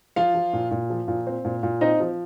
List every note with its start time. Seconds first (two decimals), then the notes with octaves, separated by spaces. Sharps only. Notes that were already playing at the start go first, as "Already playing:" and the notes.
0.16 F3 F4 F5
0.35 F3
0.53 A#2
0.71 A#2
0.90 F3
1.08 A#2
1.27 C4
1.45 A#2
1.63 A#2
1.81 C4 D#4 D#5
2.00 F3